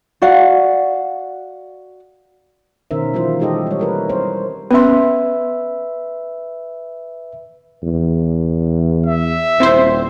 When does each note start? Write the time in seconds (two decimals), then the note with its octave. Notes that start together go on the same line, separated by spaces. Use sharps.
0.22 F#4 D5 F5 F#5
2.91 B2 D#3 C#4 A#4 C5 E5
3.14 D#3 E3 F#3 E4 F4 C5
3.40 G#3 D#4 G4 A4 D#5
3.67 G3 C#5
3.79 E4 A#4 B4
4.09 G3 C4 A#4 C5 C#5
4.71 B3 C#4 B4 E5 C6
7.83 E2
9.06 E5
9.60 D#1 C4 E4 C5